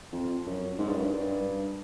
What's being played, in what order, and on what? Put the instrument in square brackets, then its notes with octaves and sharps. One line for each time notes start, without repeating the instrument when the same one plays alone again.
[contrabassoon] F2
F#2
G#2
G2
F#2
G2